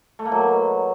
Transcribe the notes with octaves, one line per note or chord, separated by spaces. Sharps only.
A3
A#3
F#3
B2